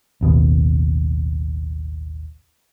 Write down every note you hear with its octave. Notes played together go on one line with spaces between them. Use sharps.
A1 D#2 B2